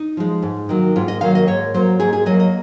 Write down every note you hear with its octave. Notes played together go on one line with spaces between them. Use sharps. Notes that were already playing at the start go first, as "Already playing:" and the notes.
Already playing: D#4
F3 G#3
G#2
D#3 F#3 A#3
G#2 F4
D#5
D#3 F#3 A#3 F5
D#5
G#2 C#5
F#3 A#3 C5
G#2 G#4
G#4
F#3 A#3 D#5
D#5